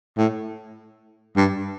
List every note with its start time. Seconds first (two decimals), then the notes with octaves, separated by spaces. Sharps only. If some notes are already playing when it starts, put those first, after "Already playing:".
0.18 A2
1.36 G2